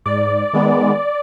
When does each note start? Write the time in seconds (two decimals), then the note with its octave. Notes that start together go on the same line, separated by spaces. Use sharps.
0.06 G#2 D5
0.53 D#3 G#3 B3